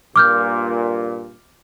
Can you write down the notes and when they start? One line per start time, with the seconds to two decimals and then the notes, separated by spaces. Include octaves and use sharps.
0.16 G2 A#2 D6 F6 G6